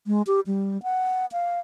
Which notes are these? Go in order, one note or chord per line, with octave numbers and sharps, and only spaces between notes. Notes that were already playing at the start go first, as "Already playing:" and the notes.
G#3
G4
G3
F#5
F5